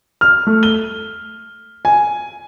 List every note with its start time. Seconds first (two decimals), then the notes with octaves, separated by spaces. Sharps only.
0.21 F6
0.47 A3
0.63 G7
1.85 G#5